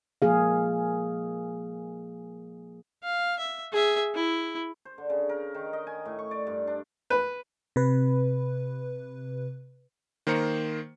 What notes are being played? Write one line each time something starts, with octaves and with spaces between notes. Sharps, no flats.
F3 A#3 G#4 F5
F5
E5
G#4 E5
E4
C5
D3
C#3
A#4
D#3
D#5
G#5
A2
C#6
D5
G2
D4
B4
C3 B4
D#3 A#3 C5 A#5 C#7